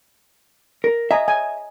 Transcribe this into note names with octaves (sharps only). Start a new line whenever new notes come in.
A#4
D#5 E5 G#5 A#5
G#5